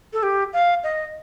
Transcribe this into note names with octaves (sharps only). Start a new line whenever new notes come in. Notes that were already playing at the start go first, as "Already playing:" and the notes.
A4
G4
F5
D#5